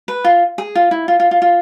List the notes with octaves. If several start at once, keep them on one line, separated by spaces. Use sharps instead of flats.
B4
F4
G#4
F4
E4
F4
F4
F4
F4